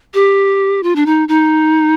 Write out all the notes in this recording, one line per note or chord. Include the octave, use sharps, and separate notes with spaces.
G4
F4
D4
D#4
D#4